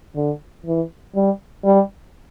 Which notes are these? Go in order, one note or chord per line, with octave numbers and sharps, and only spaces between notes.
D3
E3
G3
G3